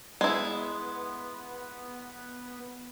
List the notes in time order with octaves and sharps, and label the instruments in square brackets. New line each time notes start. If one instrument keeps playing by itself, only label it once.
[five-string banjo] G#3 E4 [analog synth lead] B3